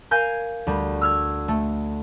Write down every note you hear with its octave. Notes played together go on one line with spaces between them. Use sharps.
A#4 F5 G#5 G6 G#6
D2 G3
E6 F6 G#6
A3